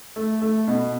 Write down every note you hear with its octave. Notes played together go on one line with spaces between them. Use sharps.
A3
A3
B2